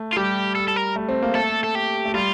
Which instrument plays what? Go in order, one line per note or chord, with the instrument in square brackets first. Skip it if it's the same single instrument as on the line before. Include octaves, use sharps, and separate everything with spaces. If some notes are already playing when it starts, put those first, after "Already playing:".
Already playing: [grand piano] A3
[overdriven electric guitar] F4
[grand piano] G3 [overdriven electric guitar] G4
[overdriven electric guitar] A4
A4
A#4
[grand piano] A3
C4
A#3
[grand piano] A3 [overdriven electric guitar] A4
[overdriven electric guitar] A4
G4
[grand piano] A3
[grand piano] G3 [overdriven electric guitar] F4